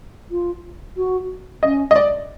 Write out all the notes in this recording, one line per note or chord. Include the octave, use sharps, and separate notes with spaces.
F4
F#4
C#4 D#5
D#5
D5